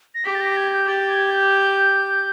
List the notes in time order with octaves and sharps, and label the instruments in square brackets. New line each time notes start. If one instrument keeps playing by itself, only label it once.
[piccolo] A#6
[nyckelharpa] G4 [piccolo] B6
[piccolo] A6
A#6
G#6
G6
[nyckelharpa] G4 [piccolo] A6
[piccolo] G#6
G6